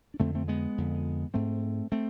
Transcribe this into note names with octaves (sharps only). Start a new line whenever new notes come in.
D4
F2 D3 A3 C4
A3 C4
G#3 B3
F2 D3
G#2 A3 C4
A3 C4